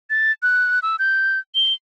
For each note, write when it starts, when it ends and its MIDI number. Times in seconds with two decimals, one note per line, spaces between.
0.10 0.32 93
0.43 0.79 90
0.83 0.96 88
0.99 1.39 91
1.55 1.73 103